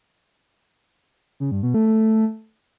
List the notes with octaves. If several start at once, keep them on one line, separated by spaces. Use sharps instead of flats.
C#3
G2
B2
A3
A3